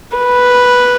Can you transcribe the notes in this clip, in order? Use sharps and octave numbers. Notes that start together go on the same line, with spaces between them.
B4